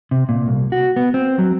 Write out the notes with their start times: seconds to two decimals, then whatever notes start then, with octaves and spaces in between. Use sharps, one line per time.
0.11 C3
0.29 A#2
0.48 C2
0.72 F#4
0.96 B3
1.14 C4
1.39 F#3